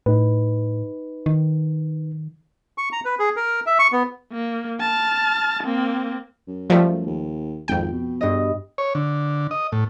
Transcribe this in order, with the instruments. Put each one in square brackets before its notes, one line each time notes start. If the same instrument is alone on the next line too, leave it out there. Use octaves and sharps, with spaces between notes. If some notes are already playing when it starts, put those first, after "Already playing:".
[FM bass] A2 [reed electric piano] D#4 B4
[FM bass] D#3
[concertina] C#6
A#5
B4
G#4
A#4
E5
C#6
B3
[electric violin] A#3
A5 F6
A#3 C4
[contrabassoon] F#2
[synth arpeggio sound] F3 G3 A3
[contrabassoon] D#2
[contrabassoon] G#1 [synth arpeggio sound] F2 G5
[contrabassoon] B2
[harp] G2 D#5
[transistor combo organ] C#5
D3
D#5
A2